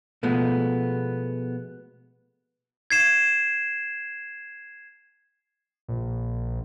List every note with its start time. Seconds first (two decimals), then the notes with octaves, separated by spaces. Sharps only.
0.23 B2 F3 G#3 A3 B3
2.91 G#6 C7 E7
5.88 A#1